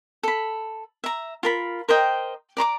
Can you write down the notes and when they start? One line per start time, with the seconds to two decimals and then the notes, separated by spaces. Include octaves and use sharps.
0.23 A4 B5
1.04 E5 A#5
1.43 F4 A#4 B5
1.89 A#4 C5 D#5 G5
2.57 D5 A#5 C6 D6